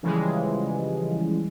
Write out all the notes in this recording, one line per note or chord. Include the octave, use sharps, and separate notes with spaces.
C#3 E3 F3 G3 G#3